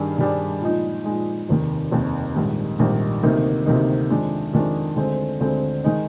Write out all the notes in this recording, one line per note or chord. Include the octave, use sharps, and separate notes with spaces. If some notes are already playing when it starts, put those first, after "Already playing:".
Already playing: G2 D#3 G3 D4 G#4
G2 D#3 G3 D4 G#4
A#2 F3 G#3 D#4
A#2 F3 G#3 D#4
F1 D#2 D#3
F1 D#2 D#3
A#1 G#2 D#3 G3
A#1 G#2 D#3 G3
D2 C3 D#3 A#3 D#4
D2 C3 D#3 A#3 D#4
F2 D#3 G#3 D4
F2 D#3 G#3 D4
D2 D3 G#3 C4
D2 D3 G#3 C4
D#3 G#3 D#4